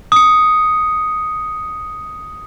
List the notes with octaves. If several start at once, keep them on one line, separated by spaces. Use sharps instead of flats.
D#6 C#7